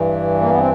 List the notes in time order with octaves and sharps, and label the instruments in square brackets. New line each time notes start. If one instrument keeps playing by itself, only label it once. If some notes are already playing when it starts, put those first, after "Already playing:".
Already playing: [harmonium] G2 E3
A#3
B3
C4